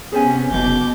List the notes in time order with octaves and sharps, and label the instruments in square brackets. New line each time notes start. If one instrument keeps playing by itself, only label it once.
[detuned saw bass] C3 [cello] B3 [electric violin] C#4 [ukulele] G#4 C5 G#5
[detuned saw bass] F#1 [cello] B2 [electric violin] D6 G6